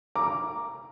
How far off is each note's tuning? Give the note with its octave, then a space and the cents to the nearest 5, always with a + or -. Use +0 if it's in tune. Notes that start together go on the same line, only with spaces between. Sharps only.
A#5 +0 D6 +0